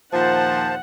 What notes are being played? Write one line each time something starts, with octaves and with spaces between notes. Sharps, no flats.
D#2 A#2 F3 C5 F#5 A5